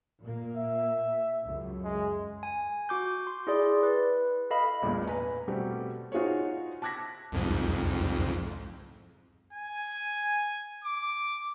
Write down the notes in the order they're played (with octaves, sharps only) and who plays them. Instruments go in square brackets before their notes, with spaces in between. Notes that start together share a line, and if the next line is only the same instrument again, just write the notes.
[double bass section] A#2 A#3
[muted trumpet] E5
[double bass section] C#2 F#2
[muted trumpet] G#3
[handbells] G#5
F#4 D6 G6
C6
E4 G#4 D5
B4
A4 D#5 F5 B5
[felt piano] A1 E2 G2 A#2
B4 G#5 A#5
B2 G3 A3 C4 G4
D#4 F4 F#4 G#4 C5 C#5
A5 D6 F#6 G#6 A#6 B6
[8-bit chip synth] C2 F2 G#2
[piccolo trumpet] G#5
D6